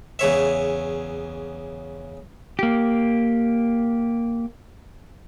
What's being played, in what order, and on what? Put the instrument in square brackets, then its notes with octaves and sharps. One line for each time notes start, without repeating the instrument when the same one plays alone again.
[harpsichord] E2 C#3 C#5 E5
[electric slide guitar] A#3 G4